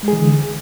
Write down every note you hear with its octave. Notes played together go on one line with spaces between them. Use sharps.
D3 E3 G#3 G#4